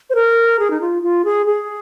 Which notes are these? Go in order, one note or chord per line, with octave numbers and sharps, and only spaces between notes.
C5
A#4
G#4
D#4
F4
F4
G#4
G#4